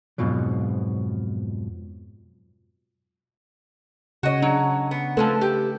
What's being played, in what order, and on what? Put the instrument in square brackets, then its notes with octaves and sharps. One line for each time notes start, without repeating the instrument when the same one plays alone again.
[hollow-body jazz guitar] F2 G#2 B2 F3 F#3
[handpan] C#3 C#5 [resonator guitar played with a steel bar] F#4 D#5
[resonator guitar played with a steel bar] F#3 [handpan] D4
[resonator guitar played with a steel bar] B3
[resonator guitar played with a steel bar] F3 G#3 C4 [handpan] A3 A4 B4
[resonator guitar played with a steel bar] G4